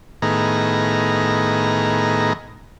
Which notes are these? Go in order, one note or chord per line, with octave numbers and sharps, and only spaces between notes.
A2 D#3 B3 G#4 A#5